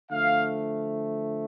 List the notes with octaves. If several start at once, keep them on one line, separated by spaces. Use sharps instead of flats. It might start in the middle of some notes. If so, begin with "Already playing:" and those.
D3 F3 A3 F5